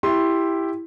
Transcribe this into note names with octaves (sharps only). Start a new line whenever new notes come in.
E4 G4 C6